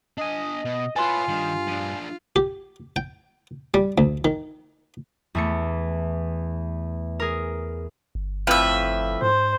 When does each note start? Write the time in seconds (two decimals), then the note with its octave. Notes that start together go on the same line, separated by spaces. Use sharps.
0.18 D4 D#5 G#5
0.65 B2
0.96 F4 A4 B4 C#5 G#5 C6
1.28 G2 D#3
1.67 F3 D4
2.36 G4
2.96 G5
3.74 G3
3.98 D2
4.25 D#3
5.35 E2 A3 C#7
7.20 G#4 A#4
8.15 G1
8.47 F2 A2 F3 B4 E5
9.22 G#2 C5